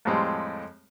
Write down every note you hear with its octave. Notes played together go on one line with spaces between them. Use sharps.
F2 A2 G3 G#3 C4